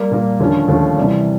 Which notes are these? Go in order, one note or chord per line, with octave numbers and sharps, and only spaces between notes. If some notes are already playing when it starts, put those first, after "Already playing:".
Already playing: G3 A#3
A#2 G3 A#3
D#2 D3 F3 A3 C#4
D#2 D3 F3 A3 C#4
C3 E3 G3